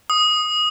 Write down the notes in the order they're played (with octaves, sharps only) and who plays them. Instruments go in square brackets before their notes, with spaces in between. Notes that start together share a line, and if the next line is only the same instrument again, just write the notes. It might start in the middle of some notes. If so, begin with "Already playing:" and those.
[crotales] D#6